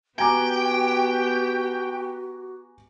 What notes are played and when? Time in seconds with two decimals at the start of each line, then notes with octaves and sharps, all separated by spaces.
0.19 B3 F#4 G4 G5 G#5 A#5 D6